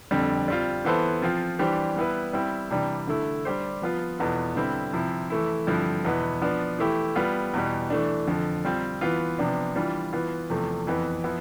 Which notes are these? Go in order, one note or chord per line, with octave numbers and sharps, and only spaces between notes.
F2 D3 G3 C4
G3 C4 F4
E3 B3 E4 A4 C5
F3 C4 F4
E3 G3 D4 G4 C5
G3 B3 E4 B4
G3 C4 E4
C3 E3 G3 D4
D3 A3 E4
G3 D4 G4 C5
F3 B3 F4
E2 B2 B3 F4 A4
D3 G3 C4 E4 B4
C3 F3 C4 E4
E3 A3 E4
G2 D3 F3 C4 E4
E2 B2 B3 E4
F3 B3 D4
E3 A3 E4 G4
G3 B3 F4
E2 B2 G3
E3 A3 D4
F2 D3 F3
G3 C4 F4
E3 B3 F4
C3 F3 B3 D4
E3 G3 D4 F4
E3 B3 F4
E2 C3 F3 A3
F2 E3 B3
F3 B3 E4